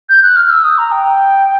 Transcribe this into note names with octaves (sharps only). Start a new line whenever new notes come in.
G6
F#6
F6
E6
D#6
A#5
G5